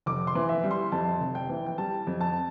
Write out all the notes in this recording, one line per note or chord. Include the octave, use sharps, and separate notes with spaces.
F1 D6
C6
E3
E5
G3
C6
F2 A5
F1
G5
E3
G5
G3 A5
F2
A5